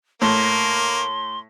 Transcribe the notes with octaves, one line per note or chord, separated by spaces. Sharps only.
A2 A#3 C6